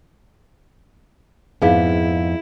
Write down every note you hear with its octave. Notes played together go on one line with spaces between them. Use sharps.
F2 G#2 B3 D#4 E4 G#4 F5